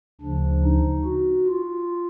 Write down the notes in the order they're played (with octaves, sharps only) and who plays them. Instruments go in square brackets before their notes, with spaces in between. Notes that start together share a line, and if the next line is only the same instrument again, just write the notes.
[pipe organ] D2 C#3 F3 D4
D#4
F#4
F4